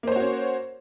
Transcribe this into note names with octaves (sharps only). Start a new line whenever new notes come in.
A#3 C#4 F#4 C5 C#5